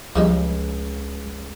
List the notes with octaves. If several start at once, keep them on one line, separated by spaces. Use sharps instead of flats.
C#2 F3 G3 G#3